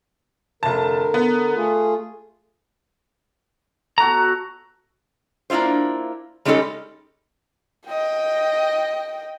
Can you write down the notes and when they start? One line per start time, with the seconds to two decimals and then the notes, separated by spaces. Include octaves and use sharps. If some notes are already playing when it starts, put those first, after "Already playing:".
0.63 F1 D3 A#4 A5
1.14 B3
1.55 A3 F4 G#4
3.98 B2 F#4 A4 A#5
5.50 A#3 D4 E4 F4 C5
6.45 G3 G#3 C#4 D#4 G4 A4
7.87 D#5 G5